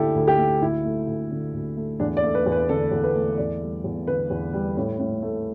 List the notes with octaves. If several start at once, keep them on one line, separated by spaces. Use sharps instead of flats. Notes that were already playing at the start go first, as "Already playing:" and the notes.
Already playing: D2 D3 A3 E4 G4 A4
D2
G4
A3
D2 E4
A3
D2
D3
D2
A3
E2 D4
D5
A3
B4
E2
B4
D3 A4
E2
B4
A3
E2 D5
G3
E2
D3 B4
E2
G3
A2
A2
A3